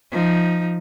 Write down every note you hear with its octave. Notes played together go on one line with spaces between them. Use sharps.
F3 D#4